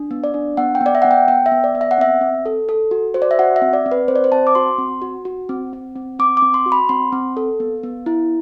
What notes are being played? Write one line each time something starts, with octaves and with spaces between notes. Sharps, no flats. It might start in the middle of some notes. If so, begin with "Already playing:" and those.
Already playing: D4
B3
D5
D4
B3 F#5
G5
B3
D5
E5
B3 F#5
G5
B3 G5
E5
B3
D5
B3
E5
F#5
C4 E5
C4
A4
A4
F#4
F#4 C5
D5
E5
F#4 F#5
E5
C4
D5
C4
B4
C4 C5
D5
C5
C4 A5
D6
F#4 C6
C4
F#4
F#4
C4
C4
C4
C4 D6
D6
C4
C6
F#4
B5
C4 C6
C4
A4
B3
B3
E4